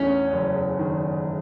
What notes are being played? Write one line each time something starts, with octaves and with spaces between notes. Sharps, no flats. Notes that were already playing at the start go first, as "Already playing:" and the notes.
Already playing: E2 A3 C#4
F#1
D#3